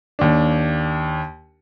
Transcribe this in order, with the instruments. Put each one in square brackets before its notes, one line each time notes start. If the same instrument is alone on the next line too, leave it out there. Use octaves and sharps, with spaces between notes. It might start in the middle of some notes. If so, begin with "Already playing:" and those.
[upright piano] D#2 D4